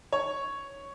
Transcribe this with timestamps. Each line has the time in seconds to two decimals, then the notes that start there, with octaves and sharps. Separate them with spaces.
0.13 C#5